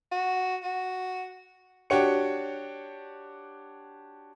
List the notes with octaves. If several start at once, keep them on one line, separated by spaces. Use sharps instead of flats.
F#4
F#4
D4 F#4 G4 C#5 C#7